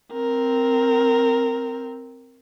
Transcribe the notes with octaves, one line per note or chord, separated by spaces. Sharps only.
C4 A#4